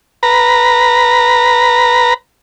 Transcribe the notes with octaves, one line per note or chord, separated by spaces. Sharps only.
B4 A#5